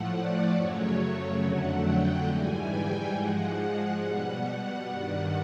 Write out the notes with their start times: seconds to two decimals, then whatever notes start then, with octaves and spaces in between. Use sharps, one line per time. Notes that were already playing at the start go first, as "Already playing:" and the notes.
Already playing: A2 F3 A3 F#5
0.11 D5
0.53 F#2 C#3 F#3 A3 C#5
0.96 C#5
1.40 F2 D3 F#3 A3 F#5
1.83 G5
2.26 G#2 E3 G3 G#5
2.69 G5
3.12 G#2 F3 G#3 F#5
3.56 F#5
3.99 B2 G3
4.85 G2 D#3 G3